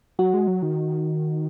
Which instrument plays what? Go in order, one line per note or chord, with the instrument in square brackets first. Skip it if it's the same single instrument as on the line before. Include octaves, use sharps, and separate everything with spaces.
[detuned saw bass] F#3 [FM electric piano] F#4
[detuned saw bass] G#3
F#3
D#3